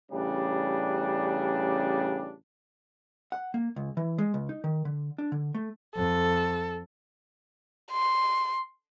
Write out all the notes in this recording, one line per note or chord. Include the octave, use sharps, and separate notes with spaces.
A1 C#3 G3 D4
F#5
A#3
C#2
E3
G#3
C#2
D#4
D#3
D3
D4
D3
A3
F2 A4
C6